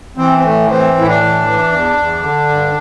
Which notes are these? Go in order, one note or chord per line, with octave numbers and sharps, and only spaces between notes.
E3 C4
C4
A2 A3
E3 C4
A2
E4
D4
E3
E3
E2
E2
D3
G2